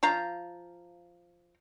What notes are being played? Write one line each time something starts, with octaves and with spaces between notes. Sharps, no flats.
F3 F5 A#5